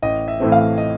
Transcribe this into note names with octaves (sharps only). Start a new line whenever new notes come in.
A1 D#5
E5
A2 E3 A3 C4
F5
D#5